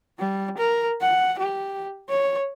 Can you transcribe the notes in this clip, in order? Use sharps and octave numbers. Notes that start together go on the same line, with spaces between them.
G3
A#4
F#5
G4
C#5